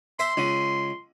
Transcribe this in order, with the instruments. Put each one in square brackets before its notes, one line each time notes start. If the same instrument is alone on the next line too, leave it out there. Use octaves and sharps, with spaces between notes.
[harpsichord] C5 E5 [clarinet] C6
[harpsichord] C#2 C#3